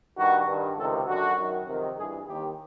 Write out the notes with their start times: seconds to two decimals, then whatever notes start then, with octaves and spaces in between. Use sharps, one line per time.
0.17 G2 D#3 F#4
0.47 G2 D#3
0.77 C#2 C3 D#3 A4
1.06 F#2 D3 F#4
1.37 F#2 D#3
1.66 F2 C3 D#3
1.97 G2 E3 G#4
2.26 D#2 D#3 G4